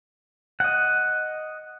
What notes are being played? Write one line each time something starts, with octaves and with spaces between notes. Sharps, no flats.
D#5 F#5